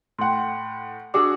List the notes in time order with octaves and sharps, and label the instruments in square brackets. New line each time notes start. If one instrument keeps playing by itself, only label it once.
[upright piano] A2 F#5 [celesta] G5 C6
[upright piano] D4 F#4 G#4 [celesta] D6 E6